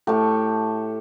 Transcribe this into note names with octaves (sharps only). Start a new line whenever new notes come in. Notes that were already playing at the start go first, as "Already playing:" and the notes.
A2 A3 G4